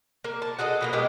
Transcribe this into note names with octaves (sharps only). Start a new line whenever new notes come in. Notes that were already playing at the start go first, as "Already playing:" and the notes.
A#3
A5
F#4 G#4 A4 D#5
B2 G#3 A#3
B2 G#3 G4